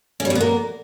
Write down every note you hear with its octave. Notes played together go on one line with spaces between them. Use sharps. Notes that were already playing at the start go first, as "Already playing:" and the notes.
C#4
G3
B2
B3
A#3